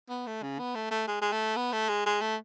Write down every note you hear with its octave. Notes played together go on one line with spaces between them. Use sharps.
B3
A3
C#3
B3
A3
A3
G#3
G#3
A3
B3
A3
G#3
G#3
A3